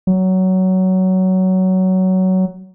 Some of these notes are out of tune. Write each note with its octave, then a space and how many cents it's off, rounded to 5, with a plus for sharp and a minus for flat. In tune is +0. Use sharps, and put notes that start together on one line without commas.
F#3 +15